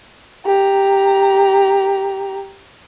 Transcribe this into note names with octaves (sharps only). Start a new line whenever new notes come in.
G4 A#5